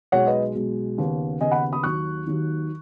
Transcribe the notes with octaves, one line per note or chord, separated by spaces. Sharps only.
B1 B2 G#3 C#5 F#5
B4 D#5
B1 B2 G#3
D#2 C#3 B3
D#2 C#3 B3 D#5 G#5
F#5 B5
B5 D#6
D#2 D#3 F#3 C#6 F#6
D#2 D#3 F#3